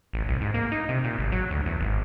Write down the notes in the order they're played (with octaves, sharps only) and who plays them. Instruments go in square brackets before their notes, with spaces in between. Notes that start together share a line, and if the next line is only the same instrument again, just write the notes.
[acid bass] A1
C2
G#2
A#3
D#4
C3
A#2
G#1
F#3
D2
E2
G#1